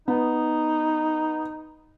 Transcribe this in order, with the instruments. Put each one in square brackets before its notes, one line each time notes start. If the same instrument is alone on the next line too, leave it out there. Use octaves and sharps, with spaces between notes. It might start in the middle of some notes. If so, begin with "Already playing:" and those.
[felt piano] B3 [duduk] D#4